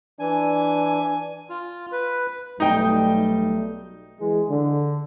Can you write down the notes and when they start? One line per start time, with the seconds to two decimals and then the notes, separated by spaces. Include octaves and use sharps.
0.20 E3 D4 G#5
1.49 F4
1.92 B4
2.60 B1 G3 A3 D#4 G5
4.19 E3 G#3
4.49 D3